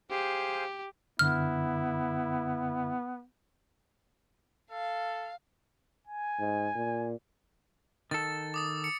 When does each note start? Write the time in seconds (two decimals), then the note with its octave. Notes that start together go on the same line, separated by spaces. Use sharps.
0.10 G4 G#4 C5 F5
1.19 F#2 D3 B3 E4 F6
4.71 A4 F5
6.08 G#5
6.40 G#2
6.75 A#2
8.11 D#3 A4 A6
8.54 D6 D#6 A6
8.84 C#7